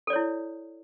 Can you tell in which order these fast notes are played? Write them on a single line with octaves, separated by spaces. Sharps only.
A4 D5 C#5 E4